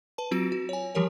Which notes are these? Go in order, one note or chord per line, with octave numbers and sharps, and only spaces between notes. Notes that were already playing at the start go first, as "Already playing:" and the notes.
B4 A5
F#3 C4 F4 F#4 A#6 D7
F#4
C#5 G#5
E3 F3 G3 G4 A#4 C#5